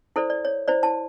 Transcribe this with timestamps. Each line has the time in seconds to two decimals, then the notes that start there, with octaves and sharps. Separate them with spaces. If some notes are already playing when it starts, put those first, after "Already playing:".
0.16 E4 A4 C5 D5
0.30 D5
0.45 C#5
0.68 E4 C5 D5
0.83 E4 A5